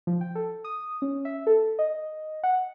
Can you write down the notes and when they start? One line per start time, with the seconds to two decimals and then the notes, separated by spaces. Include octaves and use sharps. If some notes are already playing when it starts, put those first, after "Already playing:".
0.07 F3
0.21 G5
0.35 A4
0.64 D#6
1.02 C#4
1.25 E5
1.47 A4
1.79 D#5
2.43 F#5